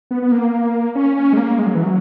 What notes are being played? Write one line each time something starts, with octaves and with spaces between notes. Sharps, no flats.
B3
B3
A#3
C#4
C#4
G#3
A#3
G#3
F#3
E3
F#3